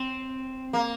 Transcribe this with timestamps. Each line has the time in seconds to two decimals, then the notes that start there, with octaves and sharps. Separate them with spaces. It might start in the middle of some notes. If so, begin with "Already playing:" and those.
Already playing: C4
0.73 A#3